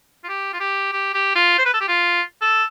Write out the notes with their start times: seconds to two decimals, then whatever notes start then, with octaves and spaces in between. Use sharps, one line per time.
0.24 F4
0.29 G4
0.53 F4
0.60 G4
0.93 G4
1.14 G4
1.35 F4
1.58 C5
1.66 B4
1.74 A4
1.81 G4
1.88 F4
2.42 A4